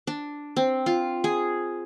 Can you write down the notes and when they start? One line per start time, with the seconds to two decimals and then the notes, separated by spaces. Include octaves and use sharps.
0.07 D4
0.57 C4
0.86 F4
1.24 G#4